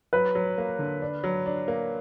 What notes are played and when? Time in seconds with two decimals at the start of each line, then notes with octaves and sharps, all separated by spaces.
0.13 F#3 B4
0.35 F#3
0.58 A#3
0.79 D3
1.02 D4
1.24 F#3
1.46 D4
1.68 A#3